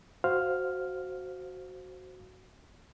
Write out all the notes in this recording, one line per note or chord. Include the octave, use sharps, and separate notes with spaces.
F#4 C5 F5 F6